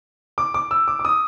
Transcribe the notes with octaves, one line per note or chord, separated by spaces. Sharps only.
D6
D6
E6
D6
D6
D#6